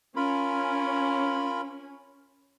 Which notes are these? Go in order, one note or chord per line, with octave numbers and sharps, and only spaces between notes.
C#4 F4 A#4 B5